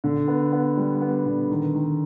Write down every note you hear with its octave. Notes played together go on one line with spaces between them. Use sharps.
D3
B3
B3
G3
B3
D3
D#3
D#3